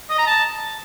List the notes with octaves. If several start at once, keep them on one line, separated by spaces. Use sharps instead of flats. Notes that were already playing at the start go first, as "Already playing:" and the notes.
D#5
A#5
A5